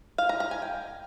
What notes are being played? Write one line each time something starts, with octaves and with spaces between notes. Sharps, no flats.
F5
A#5
A#5
G#5
G5